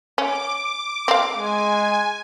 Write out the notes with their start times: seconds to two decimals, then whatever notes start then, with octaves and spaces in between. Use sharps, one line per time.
0.18 C#4 D6
1.08 C4 F5
1.37 G#3 G#5